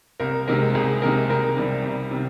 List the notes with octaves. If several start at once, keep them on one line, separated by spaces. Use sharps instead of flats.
C2 A#4
C3 D#3 G#3 A#4
C2 G#4
C3 D#3 G#3 A#4
C2 A#4
C3 D#3 G3
C2
C3 D#3